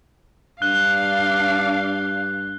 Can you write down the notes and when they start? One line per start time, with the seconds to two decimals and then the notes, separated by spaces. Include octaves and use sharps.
0.62 G2 D4 F5 F#6 G7